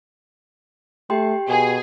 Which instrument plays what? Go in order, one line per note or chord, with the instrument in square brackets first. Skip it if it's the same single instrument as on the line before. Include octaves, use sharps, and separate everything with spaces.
[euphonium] A3 [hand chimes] G4 G5 C6
[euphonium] B2 [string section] G#4